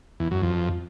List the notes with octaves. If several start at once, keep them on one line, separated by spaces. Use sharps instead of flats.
E2
F#2
F2